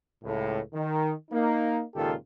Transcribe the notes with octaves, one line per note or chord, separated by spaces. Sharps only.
C#2 A2
D#3
A#3 D#4
C#2 A#2 D#3 F4 G4 A4